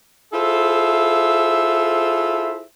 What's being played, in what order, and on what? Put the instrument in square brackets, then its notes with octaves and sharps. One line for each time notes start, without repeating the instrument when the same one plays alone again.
[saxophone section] E4 F4 G#4 A4 C5 E5